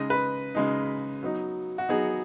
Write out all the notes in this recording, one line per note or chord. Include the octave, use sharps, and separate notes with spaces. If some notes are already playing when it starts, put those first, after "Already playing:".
Already playing: C#3 G#3 D#4 D#5
B4
C#3 G#3 D#4
F#3 B3 D#4
F#4
F#3 B3 D#4 G#4